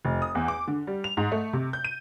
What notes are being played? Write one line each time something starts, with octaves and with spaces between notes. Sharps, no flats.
F1
D#6
E2
D6
D3
G3
F7
G#2
A3
C3
G6
D#7